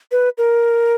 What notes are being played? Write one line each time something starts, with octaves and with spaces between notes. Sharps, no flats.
B4
A#4